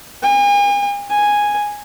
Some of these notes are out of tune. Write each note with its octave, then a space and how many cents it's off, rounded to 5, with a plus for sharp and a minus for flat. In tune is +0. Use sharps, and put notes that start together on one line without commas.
G#5 -40
G#5 -5